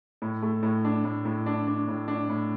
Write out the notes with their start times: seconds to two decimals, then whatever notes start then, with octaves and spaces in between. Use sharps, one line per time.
0.22 A2
0.43 A3
0.63 A2
0.84 D4
1.04 A2
1.25 A2
1.46 D4
1.67 D4
1.88 A2
2.08 D4
2.29 A2